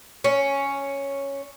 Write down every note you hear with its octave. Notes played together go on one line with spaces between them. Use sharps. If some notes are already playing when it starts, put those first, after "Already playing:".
C#4